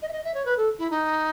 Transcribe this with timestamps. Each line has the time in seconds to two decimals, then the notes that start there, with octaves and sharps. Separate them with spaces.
0.02 D#5
0.08 E5
0.12 D#5
0.24 E5
0.34 C#5
0.45 B4
0.57 A4
0.78 E4
0.90 D#4